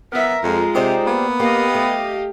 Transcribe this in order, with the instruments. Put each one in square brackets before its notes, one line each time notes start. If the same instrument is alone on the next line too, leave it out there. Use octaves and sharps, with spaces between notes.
[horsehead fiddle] B3 E5 [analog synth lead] A#4
[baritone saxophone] F2 [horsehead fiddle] G#3 F4
[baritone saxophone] C3 [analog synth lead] D#4 [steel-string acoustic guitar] G4 C5 D5
[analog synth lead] A#3 [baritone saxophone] B3
[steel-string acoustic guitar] A#3 [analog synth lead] G4 [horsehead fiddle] D#5 F5
[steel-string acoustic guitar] A3